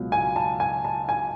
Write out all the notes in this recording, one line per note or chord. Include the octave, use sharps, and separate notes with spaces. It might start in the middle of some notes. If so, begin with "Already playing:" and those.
Already playing: C#2 B2 F#3
G#5
A5
G#5
A5
G#5